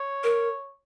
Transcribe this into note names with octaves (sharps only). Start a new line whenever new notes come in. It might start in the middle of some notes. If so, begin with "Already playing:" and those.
Already playing: C#5
A#4